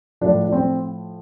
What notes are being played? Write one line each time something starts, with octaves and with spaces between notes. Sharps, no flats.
A2 F3 D4
D4
C4